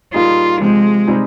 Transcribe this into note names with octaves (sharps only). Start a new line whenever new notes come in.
A#2 G3 A#3 D#4 F4 G#4
C3 F3 G#3 C4
C3 G3 C4 D#4 G#4